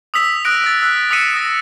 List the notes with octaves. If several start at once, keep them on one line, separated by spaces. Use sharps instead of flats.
D#6 E6 B6 F7
D#6 F#6 A#6 D7
E6 A6
E6 F#6 B6
D#6 E6 B6 C#7 D#7 E7
D#6 A#6